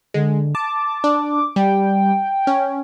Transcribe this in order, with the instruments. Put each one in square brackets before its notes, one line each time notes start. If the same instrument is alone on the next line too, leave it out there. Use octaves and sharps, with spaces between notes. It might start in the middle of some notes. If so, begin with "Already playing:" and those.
[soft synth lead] D3 [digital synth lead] G#3
[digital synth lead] A5 [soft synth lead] D6
[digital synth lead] D4
[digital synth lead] G3 [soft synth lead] G5
[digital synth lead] C#4